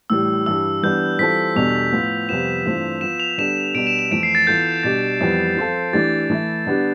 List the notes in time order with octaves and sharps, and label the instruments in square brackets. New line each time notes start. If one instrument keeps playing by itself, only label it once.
[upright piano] A2 E3 G3 [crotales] E6
[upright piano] G2 E3 G3 [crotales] E6
[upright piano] E3 G3 B3 D4 [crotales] G6
[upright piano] E3 G3 C4 F4 A4 [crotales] B6
[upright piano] E2 B2 G3 D4 A4 [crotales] F7
[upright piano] A2 F3 B3 F4
[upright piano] F2 C3 G3 B3 F4 [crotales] E7
[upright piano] G2 E3 A3 C4 F4
[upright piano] F3 B3 F4 [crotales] E7
[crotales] F7
[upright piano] D3 G3 B3 D4 A4 [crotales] E7
[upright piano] B2 G3 B3 D4 [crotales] D7
[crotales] E7
F7
[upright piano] F2 E3 A3 E4 [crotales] D7
[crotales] C7
A6
[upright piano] E3 B3 F4 A4 [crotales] G6
[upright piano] B2 G3 D4 G4 [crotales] A6
[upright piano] F2 E3 G3 B3
F3 C4 F4 A4
[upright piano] E3 A3 D4 G4 [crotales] A6
[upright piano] E3 A3 E4
D3 G3 B3 D4 G4